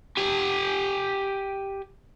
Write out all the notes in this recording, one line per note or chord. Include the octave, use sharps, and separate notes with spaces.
G4 G#5